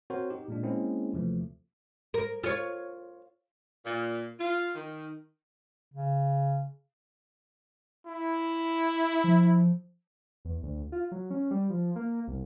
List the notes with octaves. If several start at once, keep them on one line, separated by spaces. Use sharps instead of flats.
C4 F#4 A#4 C5 C#5
D#4 G4
A#2 G#3 D4
G#3 A#3 C4 C#4 E4 G#4
D#2 C3 E3 F3 A3
A#4
F4 C#5
A#2
F4
D#3
C#3
E4
F3
E2
D2
F4
F#3
C#4
G3
F3
A#3
C2